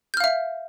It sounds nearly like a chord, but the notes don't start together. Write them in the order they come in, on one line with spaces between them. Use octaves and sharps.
G6 F6 F5 E5